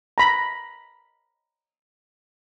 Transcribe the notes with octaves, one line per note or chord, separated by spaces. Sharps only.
A#5 B5